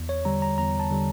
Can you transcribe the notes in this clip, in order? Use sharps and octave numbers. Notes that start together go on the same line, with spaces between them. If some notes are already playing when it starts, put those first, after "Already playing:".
Already playing: E2
C#5
D3 G3 A#5
A#5
E2 A#5
A5
D3 G3